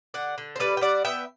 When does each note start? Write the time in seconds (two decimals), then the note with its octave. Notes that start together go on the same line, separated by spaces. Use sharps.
0.14 D3 D5 F#5
0.38 D3
0.56 C5
0.60 G3 B4 D5
0.77 G5
0.81 G3 D5 F#5
1.05 B3 E5 G5